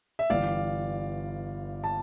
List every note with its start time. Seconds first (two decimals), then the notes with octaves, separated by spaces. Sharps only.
0.19 E5
0.30 G1 G2 E3 G3 D5 F5
1.84 A5